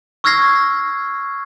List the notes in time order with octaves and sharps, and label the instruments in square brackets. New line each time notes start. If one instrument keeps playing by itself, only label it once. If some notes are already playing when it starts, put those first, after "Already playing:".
[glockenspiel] C#6 E6 F6 G#6 A#6 C7